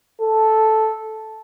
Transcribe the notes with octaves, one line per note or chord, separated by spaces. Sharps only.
A4